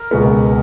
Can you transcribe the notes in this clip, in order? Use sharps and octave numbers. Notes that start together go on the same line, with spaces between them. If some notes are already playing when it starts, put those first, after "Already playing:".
Already playing: A#4
C#2 B2 G#3 B3